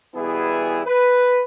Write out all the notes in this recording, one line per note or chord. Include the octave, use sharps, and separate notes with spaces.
B2 E3 G3 B3 E4 G#4
B4